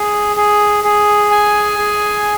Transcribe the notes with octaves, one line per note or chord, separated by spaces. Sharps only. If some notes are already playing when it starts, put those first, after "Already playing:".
Already playing: G#4
G#4
G#4
G#5
G#4